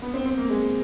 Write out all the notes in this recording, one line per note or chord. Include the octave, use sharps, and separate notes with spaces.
B3
C4
C4
A#3
G#3